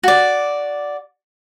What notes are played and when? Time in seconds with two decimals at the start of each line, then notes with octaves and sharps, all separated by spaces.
0.03 F#4 D5